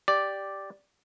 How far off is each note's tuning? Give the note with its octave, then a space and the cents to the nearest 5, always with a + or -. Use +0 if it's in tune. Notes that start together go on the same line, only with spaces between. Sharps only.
G4 +0 D5 +0